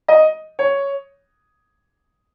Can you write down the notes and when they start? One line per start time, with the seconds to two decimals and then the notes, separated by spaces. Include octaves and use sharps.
0.08 D#5
0.59 C#5